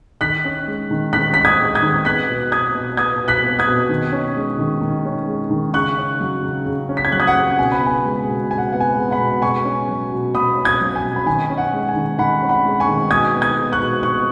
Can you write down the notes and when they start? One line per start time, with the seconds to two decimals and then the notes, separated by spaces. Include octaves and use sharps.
0.21 D#3 F#6 B6
0.45 C#4
0.67 G#3
0.91 D#3
1.13 D#3 F#6 B6
1.34 C#4 B6
1.45 D#6 G#6
1.59 G#3
1.75 D#6 G#6
1.83 D#3
2.05 B3 F#6 B6
2.28 B2
2.52 B3 D#6 G#6
2.75 B2
2.97 B3 D#6 G#6
3.21 B2
3.28 F#6 B6
3.43 B3
3.59 D#6 G#6
3.67 B2
3.89 D#3
4.12 C#4
4.36 G#3
4.59 D#3
4.81 D#3
5.05 C#4
5.27 G#3
5.51 D#3
5.74 C#3 C#6 F#6
5.98 C#4
6.21 F#3
6.43 C#3
6.66 C#3
6.89 C#4
6.97 B6
7.05 G#6
7.12 F#3 F#6
7.20 D#6 G#6
7.27 F#5
7.35 C#3
7.58 B2 G#5
7.72 B5
7.81 B3
7.86 G#5
8.05 G#3
8.28 B2
8.51 B2 G#5
8.58 F#5
8.72 B3 F#5
8.81 G#5
8.96 G#3
9.11 F#5 B5
9.19 B2
9.42 B2 G#5 C#6
9.65 C#4
9.89 F#3
10.12 B2
10.35 B2 B5 D#6
10.57 C#4
10.65 D#6 G#6
10.81 F#3
10.96 G#5
11.04 B2
11.16 B5
11.26 D#3 G#5
11.50 C#4
11.58 F#5
11.73 G#3
11.89 G#5
11.96 D#3
12.19 D#3 F#5 B5
12.42 C#4
12.49 F#5 B5
12.66 G#3
12.80 G#5 C#6
12.88 D#3
13.10 B2 D#6 G#6
13.34 B3
13.41 D#6 G#6
13.58 G#3
13.72 C#6 F#6
13.80 B2
14.03 B2 C#6 F#6